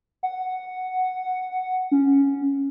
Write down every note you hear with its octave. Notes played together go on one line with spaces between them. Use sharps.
F#5
C#4